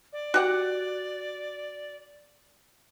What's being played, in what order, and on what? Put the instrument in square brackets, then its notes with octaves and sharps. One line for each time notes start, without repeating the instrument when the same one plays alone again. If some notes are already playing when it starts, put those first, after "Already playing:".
[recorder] D5
[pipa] F#4 G4 F#5